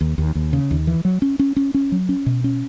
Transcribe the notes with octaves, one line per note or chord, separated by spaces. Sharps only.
D#2
D#2
D#2
C#3
D#2
E3
F#3
C#4
C#4
C#4
C#4
F#3
C#4
B2
C#4